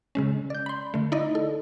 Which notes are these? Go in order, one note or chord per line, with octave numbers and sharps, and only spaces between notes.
C#3 G#3 C#4
D5 G6
B5 C6
D3 A3
D#4 E4 D5 D#5
A4